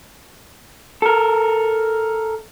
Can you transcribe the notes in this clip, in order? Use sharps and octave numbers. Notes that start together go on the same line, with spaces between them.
A4 A#4